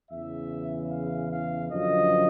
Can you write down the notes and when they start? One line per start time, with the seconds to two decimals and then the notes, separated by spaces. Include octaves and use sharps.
0.11 E2 C#3 E3 E5
0.91 F5
1.31 F5
1.70 F#2 D3 F3 D#5